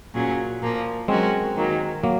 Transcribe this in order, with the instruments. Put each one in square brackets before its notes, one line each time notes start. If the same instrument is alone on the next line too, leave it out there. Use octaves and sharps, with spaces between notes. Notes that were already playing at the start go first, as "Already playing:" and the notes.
[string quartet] A#2 F#3 C#4 G#4
A#2 F3 A#3
[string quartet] F#3 C#4 F#4 A#4 [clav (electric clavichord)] G#3 C4
[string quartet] D#3 F#3 A#3
[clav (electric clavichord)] F#3 A#3